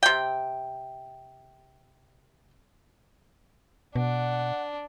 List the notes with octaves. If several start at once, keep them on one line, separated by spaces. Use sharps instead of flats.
C3 G5
B2 D4 F#5